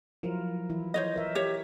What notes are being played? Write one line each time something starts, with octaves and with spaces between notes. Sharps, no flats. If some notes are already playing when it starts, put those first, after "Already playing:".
F3 F#3 E4 F4 A#4
E3 E4
C5 C#5 D#5
A#4 E5
G4 C#5